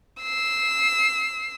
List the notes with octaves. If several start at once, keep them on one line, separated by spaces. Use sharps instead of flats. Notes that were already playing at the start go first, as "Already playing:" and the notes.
E6 C7